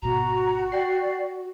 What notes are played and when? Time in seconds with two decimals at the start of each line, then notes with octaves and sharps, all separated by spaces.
0.02 G#1 B2 F#4 A#5
0.72 D5 G5 C7